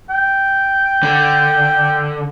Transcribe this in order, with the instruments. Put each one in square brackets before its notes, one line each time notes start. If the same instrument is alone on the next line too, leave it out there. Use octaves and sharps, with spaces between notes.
[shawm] G5
[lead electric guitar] D3